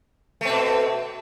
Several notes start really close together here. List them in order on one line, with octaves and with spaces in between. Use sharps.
A3 C4 B2